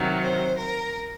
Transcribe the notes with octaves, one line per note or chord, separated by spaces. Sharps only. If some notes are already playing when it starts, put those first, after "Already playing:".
Already playing: C3 D#3 F#3
C5
A#4